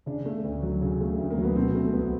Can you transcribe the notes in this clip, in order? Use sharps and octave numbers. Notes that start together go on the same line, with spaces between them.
C#3 D4
A3
D2
F#3
C#3
A3
D2
A#3
F#3
B3
B2 C4
A3 C4
C2 B3